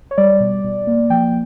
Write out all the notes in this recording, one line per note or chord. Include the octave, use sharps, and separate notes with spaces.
C#5
G3 D5
B2
B2
A#3
F3 G5